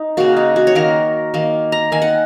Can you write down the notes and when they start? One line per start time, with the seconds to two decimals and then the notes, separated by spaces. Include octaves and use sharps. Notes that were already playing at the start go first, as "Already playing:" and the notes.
Already playing: D#4
0.17 C#3 A#3 F#4
0.37 D#4
0.56 F#4
0.67 C#5
0.75 D#3 A#3 A#4
1.34 D#3 A#3
1.72 A#5
1.92 D#3 A#3 G#5
2.02 F#5